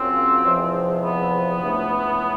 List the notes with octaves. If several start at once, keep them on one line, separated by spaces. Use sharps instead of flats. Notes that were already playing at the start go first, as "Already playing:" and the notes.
Already playing: C#3 F#3 A#3 C4 C#4 F4
E2 C3 F3 G#3
B3
C#2 C#3 E3 A3 D4